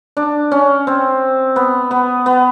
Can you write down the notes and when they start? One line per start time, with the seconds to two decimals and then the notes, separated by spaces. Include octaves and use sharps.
0.17 D4
0.52 C#4
0.87 C4
1.56 B3
1.91 B3
2.26 B3